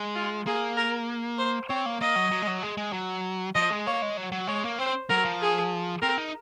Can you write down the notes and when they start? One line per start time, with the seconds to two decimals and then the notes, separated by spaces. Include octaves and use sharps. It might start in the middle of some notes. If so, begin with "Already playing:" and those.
Already playing: G#3
0.15 F4
0.47 A#3 G#4
0.77 A#4
1.38 C5
1.69 C4 C#5
1.86 A#3
2.01 A#3 D#5
2.16 F#3
2.31 F#3
2.42 G#3
2.47 F#3
2.63 G#3
2.77 G#3
2.93 F#3
3.55 F3 D#5
3.70 G#3
3.87 A#3 C#5
4.02 G#3
4.17 F#3
4.32 F#3
4.47 G#3 C#5
4.64 A#3
4.78 C4 C5
5.10 F#3 A#4
5.25 F3
5.41 G#4
6.02 C4 A#4
6.17 D#4